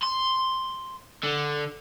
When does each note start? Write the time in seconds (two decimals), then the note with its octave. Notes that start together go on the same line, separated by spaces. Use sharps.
0.03 C6
1.24 D3